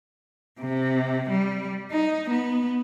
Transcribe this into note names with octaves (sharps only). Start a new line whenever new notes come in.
C3
G3
D#4
B3